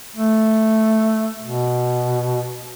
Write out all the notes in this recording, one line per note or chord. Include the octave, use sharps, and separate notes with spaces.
A3
B2